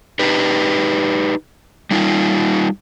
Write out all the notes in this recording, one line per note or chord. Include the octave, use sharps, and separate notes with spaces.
D#4 G4 B4
G3 D#4 F4